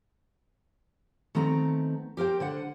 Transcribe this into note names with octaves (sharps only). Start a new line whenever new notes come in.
D#3 A3 B3 C4 A#5
G4 A#4 C5 G5
D3 C5 F#5